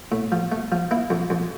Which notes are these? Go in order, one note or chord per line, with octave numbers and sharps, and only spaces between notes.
A2
F3
A3
F3
A#3 E4
F2
F2